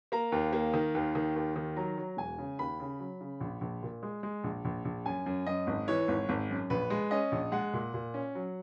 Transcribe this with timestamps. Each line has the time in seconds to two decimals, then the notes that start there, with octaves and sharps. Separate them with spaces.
0.12 A#3 A#5
0.32 D#2
0.53 A#3
0.74 D#3
0.95 D#2
1.15 D#3
1.36 D#2
1.56 D#3
1.76 F#3 A#5
1.97 F#3
2.17 E1 G#5
2.38 C#3
2.59 D#2 B5
2.80 C#3
3.00 F#3
3.21 C#3
3.40 A#1
3.61 A#1
3.83 A#2
4.03 G#3
4.23 G#3
4.44 A#1
4.65 A#1
4.85 A#1
5.06 F#2 G#5
5.26 F#2
5.46 F#2 D#5
5.67 G#1
5.88 E3 C#5
6.08 G#1
6.29 G#1
6.50 F#2
6.70 A#1 B4
6.90 G#3
7.11 C#4 D#5
7.32 A#1
7.52 G#3 F#5
7.73 A#2
7.94 A#2
8.14 C#4
8.35 F#3